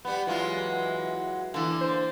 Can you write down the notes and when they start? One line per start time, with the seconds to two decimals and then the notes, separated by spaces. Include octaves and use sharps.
0.05 G3 B3
0.27 E3 F#3 G#3 F4
1.54 D3 E3 A#3
1.81 C5